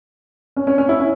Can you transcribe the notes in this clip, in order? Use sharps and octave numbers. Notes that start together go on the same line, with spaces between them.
C#4
C#4
C#4
E4
C#4